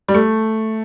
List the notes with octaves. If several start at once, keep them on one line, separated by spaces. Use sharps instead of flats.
G3
A3